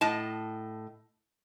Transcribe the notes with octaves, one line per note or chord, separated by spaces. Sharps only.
A2 D#5 A5